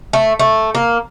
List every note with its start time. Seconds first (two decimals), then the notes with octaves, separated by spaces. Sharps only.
0.13 A3
0.40 A3
0.75 A#3